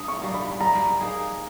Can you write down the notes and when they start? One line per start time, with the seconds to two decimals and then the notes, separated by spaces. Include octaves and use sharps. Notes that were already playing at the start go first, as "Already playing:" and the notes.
Already playing: G2 D#6
0.08 C#6
0.21 G3 A#3 D#4
0.34 B5
0.60 G3 A#5
1.00 A#3 D#4 G#4